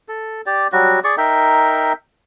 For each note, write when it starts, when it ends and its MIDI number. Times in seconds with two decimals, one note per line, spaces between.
0.08 0.41 69
0.46 0.67 67
0.46 0.67 74
0.72 1.00 54
0.72 1.00 55
0.72 1.00 66
1.04 1.15 68
1.04 1.15 74
1.04 1.15 85
1.18 1.93 63
1.18 1.93 70
1.18 1.93 76
1.18 1.93 79